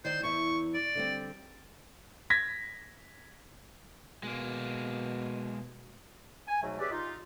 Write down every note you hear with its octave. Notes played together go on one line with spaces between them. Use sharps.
D#3 C5 D5
E2 E4 C#6
D5
D3 G3 C4
G#6 A#6 B6
B2 G#3 A#3
G#5
G#2 B2 F#3 A3
C#4 G4 G#4 B4 D5 E5
D#4 F4